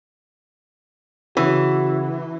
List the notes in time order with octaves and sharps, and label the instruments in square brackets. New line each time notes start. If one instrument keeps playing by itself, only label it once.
[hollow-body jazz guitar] C#3 [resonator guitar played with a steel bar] E3 [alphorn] F#4